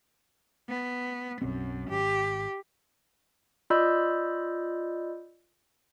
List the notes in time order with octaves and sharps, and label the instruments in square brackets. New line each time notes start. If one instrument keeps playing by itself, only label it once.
[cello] B3
[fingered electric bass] B1 C4 [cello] F#2
[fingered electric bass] G#1 [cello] G4
[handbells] F4 D5 D#5 B5 E6 G6